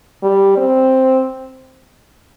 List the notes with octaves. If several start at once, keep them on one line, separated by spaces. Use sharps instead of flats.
G3
C4